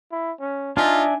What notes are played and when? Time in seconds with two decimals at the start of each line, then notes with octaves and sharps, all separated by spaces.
0.11 E4
0.40 C#4
0.77 D4 D#4 F4 E5 G#5